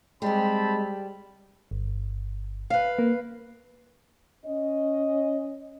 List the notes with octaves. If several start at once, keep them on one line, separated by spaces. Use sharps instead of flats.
G3 G#3 C4 G4 A5 B5
G1
B4 F5
A#3
C#4 D#5